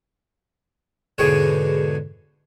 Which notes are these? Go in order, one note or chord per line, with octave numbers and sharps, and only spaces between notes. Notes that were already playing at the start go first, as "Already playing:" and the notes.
E2 G#2 B2 D3 G#4 C#5